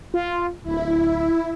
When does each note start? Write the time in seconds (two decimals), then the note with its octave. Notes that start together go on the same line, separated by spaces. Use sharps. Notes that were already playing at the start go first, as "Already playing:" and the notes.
0.14 F4
0.63 D1 E4